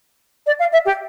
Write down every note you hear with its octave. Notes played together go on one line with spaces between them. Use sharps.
D5
F5
E5
G4